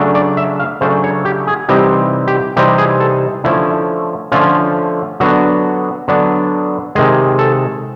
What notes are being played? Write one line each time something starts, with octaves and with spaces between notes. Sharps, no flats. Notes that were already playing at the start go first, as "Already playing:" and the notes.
Already playing: C#3 F#3 A3 D4
D5
E5
F5
C#3 F#3 A3 D4 C5
C#5
G4
G#4
C3 E3 G3 C4 D#4 G4
G4
C3 E3 G3 C4 D#4 G4
G#4
A4
D3 F3 A3 C#4 E4
D3 F3 A3 C#4 F4
D3 F#3 B3 D4 F#4
D3 F#3 B3 D4
C3 D#3 G#3 G#4
A4